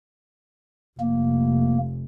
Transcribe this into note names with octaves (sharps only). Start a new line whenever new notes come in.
F1 A#3